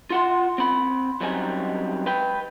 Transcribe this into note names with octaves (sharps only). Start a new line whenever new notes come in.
F4 F#5 C6
C4 B5
F#2 F#3 G3 C4 D#4 G#5
B4 G5